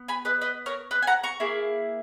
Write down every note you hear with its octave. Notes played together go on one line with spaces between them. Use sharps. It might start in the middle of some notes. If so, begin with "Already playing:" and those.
Already playing: B3
G#5 B5
B4 D#5
B4 D#5
A#4 C#5
B4 D#5
G#5
F#5 A#5
A#5 C#6
A#3 E4 G#4